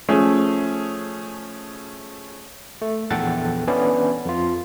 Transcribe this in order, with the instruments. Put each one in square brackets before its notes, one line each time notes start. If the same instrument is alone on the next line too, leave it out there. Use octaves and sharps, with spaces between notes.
[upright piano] F3 A3 C#4 G#4
[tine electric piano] A3
A#1 E2 A4 F#5 G5 A6
E3 B3 C#4 D4 E4 D5
F2 F4